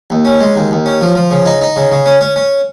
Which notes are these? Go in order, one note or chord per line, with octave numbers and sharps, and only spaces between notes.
D#2
C#4
G#3
D#2
D#2
C#4
F3
F3
C#3
D#4
D#4
C#3
C#3
C#4
C#4
C#4